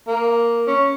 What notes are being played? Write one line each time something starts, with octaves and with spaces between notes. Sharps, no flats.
A#3
C#4